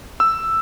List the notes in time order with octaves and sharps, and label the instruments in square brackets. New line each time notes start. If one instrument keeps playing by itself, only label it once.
[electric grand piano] E6